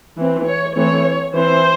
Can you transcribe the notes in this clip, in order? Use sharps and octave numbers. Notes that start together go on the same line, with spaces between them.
E3 C4
C#5
E3 A3 C4 C#5
E3 C4 C5